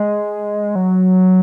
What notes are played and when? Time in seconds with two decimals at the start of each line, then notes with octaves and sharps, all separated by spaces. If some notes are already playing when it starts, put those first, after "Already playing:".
Already playing: G#3
0.75 F#3